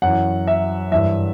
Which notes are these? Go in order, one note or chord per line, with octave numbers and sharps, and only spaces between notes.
F#2 E3 F#5
E5
G2 E3 E5